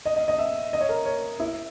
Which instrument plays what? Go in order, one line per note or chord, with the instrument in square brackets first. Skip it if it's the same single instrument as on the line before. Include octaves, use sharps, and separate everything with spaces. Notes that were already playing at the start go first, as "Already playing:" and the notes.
[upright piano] D#5
D#5
D#5
E5
D#5
C#5
A#4
C#5
E4